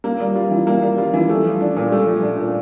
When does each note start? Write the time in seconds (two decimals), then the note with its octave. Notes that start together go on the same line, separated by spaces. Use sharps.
0.04 A#3
0.20 G3
0.35 F4
0.51 E3
0.67 A#3
0.82 G3
0.98 F4
1.14 E3
1.29 A3
1.45 F3
1.60 D4
1.77 A#2
1.92 A3
2.07 F3
2.23 D4
2.39 A#2